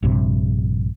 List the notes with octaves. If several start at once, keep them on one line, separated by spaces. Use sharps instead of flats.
A#1 G2 C3